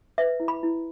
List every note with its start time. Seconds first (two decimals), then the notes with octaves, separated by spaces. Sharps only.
0.18 B4 E5
0.40 E4
0.48 B5
0.63 E4